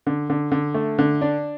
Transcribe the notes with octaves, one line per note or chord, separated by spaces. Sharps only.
D3
D3
D3
A3
D3
D4